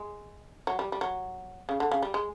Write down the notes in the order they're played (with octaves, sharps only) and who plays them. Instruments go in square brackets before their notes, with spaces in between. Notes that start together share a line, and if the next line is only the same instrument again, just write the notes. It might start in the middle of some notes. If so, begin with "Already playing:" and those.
Already playing: [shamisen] G#3
F#3
G3
G3
F#3
C#3
D3
C#3
G3
G#3